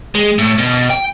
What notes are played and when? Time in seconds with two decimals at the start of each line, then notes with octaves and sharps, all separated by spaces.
0.15 G#3
0.38 A2
0.58 B2
0.90 G5